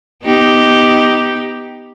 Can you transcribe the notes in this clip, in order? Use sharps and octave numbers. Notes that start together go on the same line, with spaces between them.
B3 D#4 G4